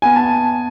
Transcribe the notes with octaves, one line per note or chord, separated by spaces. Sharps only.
B3 G#5
A5